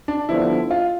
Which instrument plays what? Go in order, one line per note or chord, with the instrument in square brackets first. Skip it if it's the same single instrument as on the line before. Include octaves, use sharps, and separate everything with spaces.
[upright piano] D4
[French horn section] G2 D3 F3 B3 D4 [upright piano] E4
[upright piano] F4